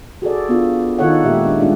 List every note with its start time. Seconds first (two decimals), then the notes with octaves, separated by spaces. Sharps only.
0.22 F#4 G#4 A4 D5
0.49 B3 D4 F4
0.99 D#3 D#4 F4 A4 C#5 F#5
1.24 A#2 G#3 G4 E5
1.46 D4
1.59 G3 G#3 C#4 D4 F4